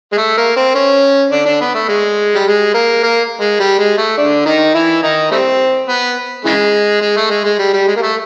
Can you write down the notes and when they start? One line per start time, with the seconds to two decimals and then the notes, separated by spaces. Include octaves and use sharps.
0.12 G#3
0.18 A3
0.37 A#3
0.56 C4
0.75 C#4
1.31 D3 D4
1.46 D3 D4
1.61 B3
1.75 A3
1.89 G#3
2.34 G3
2.47 G#3
2.74 A#3
3.04 A#3
3.41 G#3
3.60 G3
3.79 G#3
3.98 A3
4.18 D3 D4
4.45 D#3 D#4
4.74 E3 E4
5.02 D#3 D#4
5.31 G3 A3 C4
5.88 B3
6.45 C#3 E3 G#3
7.01 G#3
7.17 A3
7.30 G#3
7.45 G#3
7.59 G3
7.73 G3
7.88 G#3
7.96 A#3
8.02 A3